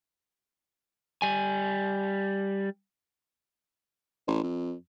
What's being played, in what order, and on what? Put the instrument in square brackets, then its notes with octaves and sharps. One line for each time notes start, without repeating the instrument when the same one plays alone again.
[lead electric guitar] G3 G#5
[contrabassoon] A1
F2